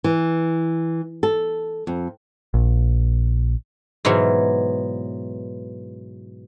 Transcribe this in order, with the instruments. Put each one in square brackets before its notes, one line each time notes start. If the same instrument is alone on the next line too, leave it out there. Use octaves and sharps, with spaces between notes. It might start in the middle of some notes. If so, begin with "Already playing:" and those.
[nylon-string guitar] E3
A4
F2
[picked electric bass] A#1
[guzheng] G#2 B2 E3 F#3